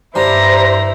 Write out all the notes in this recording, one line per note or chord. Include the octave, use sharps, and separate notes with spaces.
G2 G3 E4 C5 A#5